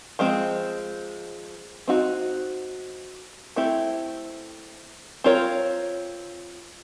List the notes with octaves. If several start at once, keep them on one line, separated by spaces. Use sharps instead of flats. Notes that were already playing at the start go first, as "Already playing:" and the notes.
F3 G#3 C4
C4 D#4 F#4
A3 C4 E4 G4
C4 F4 A#4 C#5